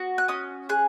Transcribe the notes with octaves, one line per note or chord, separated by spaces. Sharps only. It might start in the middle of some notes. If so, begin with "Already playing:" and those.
Already playing: B3 F#4
F#6
C#4 D#6
G#4 F#6